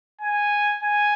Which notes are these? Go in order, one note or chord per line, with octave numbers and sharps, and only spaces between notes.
G#5
G#5